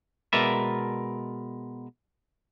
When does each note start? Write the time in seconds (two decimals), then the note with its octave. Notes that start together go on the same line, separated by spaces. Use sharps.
0.33 B2 G#3 A#4 B4 D5 E5